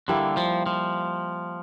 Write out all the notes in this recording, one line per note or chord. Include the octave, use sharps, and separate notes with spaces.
D3 G3 A#3 E4
F3
F3